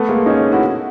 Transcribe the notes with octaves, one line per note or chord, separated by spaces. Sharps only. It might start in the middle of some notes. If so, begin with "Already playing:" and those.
Already playing: A3 B3
G#3 A#3
C#4 D#4
E4 F#4